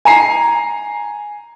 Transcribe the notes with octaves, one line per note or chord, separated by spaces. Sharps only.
G#5 A#5 C7